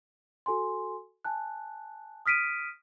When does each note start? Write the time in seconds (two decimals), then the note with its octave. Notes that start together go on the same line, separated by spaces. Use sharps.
0.46 F#4 A4 G#5 C6
1.25 G#5 A5 F#6
2.26 D#6 F6 B6 D7 D#7